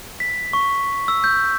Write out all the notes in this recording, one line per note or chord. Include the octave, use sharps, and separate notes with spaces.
B6
C#6
E6
G6